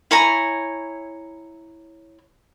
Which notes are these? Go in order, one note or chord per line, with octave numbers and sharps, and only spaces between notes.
E4 C#5 G#5 A#5